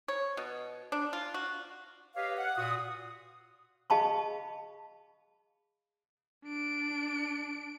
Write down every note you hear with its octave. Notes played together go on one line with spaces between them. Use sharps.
C#5
B2
D4
F4
F#4
G4 B4 C#5 D#5 F5
F#5
A#2 F#4 D#6
G#4 D#5 F5 A5 B5 C#6
D4 D7